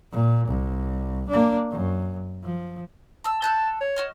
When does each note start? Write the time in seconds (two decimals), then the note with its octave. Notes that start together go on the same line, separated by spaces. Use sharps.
0.12 A#2
0.48 C2
1.29 A#3 D4
1.71 F#2
2.43 F3
3.24 A5 E6
3.42 A4 A5 F#6 G6
3.81 C#5
3.96 F#4 D#5 F6